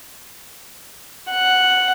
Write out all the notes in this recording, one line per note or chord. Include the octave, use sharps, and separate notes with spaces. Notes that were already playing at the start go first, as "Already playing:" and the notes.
F#5